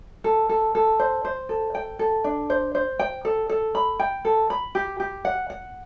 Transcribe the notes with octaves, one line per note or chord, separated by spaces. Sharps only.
A4
A4
A4
C5
C5
A4
G5
A4
D4
C5
C5
G5
A4
A4
B5
G5
A4
B5
G4
G4
F#5
F#5